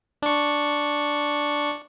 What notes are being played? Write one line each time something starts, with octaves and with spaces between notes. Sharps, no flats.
D4 C#6